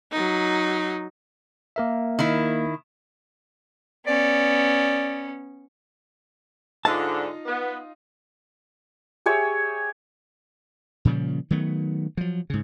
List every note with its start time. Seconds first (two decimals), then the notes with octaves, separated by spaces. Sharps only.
0.12 F#3 D#4
1.76 A#3 A#4 E5
2.19 D#3 E4
4.07 B3 C#4 D5
6.85 G#2 D3 D#4 F4 D#5 A5
7.46 B3
9.26 G4 G#4 C#5 E5
11.05 A#2 C#3 F3 G3
11.50 D#3 F#3 A3 B3
12.17 F3 F#3
12.50 G#2 C#3